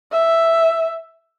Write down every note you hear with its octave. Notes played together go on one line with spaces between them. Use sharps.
E5